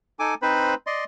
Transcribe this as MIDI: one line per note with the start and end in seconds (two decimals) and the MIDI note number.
0.19 0.34 63
0.19 0.34 69
0.19 0.34 80
0.19 0.34 86
0.42 0.74 60
0.42 0.74 63
0.42 0.74 71
0.42 0.74 72
0.42 0.74 83
0.87 1.04 74
0.87 1.04 75
0.87 1.04 84